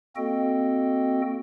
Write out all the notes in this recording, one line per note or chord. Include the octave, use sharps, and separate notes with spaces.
A#3 C4 F#4 A4 D#5 G5